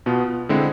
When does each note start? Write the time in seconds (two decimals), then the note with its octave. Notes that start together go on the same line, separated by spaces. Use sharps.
0.06 B2 B3 F4
0.49 D3 G#3 C4 E4